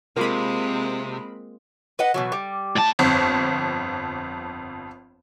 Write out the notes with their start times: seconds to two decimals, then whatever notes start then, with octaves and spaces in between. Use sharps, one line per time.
0.16 C3 G#3 A#3 C4 F4 A#4 F5 B5
1.99 B4 D#5 F#5
2.14 B2 E3 F#3
2.32 G3
2.76 A2 A5
2.99 G1 F2